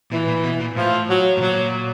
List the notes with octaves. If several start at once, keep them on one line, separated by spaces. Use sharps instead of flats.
A#2 E3
A#2
B2
A#2
A2 F3
F#3
A2
A#2 F#3